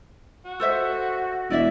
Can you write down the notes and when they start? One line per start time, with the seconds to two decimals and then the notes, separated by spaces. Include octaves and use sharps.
0.45 F#4
0.60 A4 C5 E5
1.50 E1 E4 D5 E5